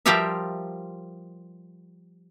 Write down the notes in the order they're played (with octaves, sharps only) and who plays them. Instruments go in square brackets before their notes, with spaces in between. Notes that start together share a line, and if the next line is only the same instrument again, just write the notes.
[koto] F3 G3 F4 G4 A#4 E5